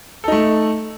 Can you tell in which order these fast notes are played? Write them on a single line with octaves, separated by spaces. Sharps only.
A4 D#4 A3